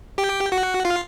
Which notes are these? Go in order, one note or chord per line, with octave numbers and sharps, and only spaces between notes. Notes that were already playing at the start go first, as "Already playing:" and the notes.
G4 G5
F#4 F#5
F4 F5